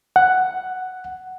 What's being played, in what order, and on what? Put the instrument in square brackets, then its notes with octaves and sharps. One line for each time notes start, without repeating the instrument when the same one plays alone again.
[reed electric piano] F#5